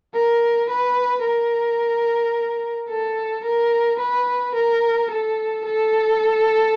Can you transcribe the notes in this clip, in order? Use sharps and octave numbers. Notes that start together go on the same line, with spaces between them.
A#4
B4
A#4
A4
A#4
B4
A#4
A4
A4